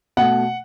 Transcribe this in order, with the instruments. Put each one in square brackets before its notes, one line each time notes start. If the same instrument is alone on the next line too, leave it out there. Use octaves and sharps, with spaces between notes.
[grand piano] B2 A3 F#5